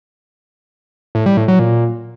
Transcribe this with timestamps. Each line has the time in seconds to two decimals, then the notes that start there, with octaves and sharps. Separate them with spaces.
1.15 A2
1.26 G3
1.37 A2
1.48 F#3
1.59 A#2